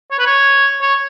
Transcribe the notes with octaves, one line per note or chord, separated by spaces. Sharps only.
C#5
B4
C#5
C#5